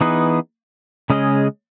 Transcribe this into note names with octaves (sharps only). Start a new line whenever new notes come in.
E3 B3 D#4 G#4 B4
C#3 G#3 C#4 G#4 D#5